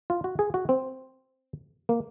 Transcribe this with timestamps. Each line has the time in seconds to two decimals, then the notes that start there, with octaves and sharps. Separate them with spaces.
0.10 F4
0.24 F#4
0.39 G#4
0.54 F#4
0.69 C4
1.89 A#3